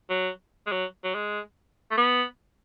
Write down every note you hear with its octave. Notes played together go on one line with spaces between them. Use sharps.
F#3
G#3
F#3
F#3
G#3
A3
B3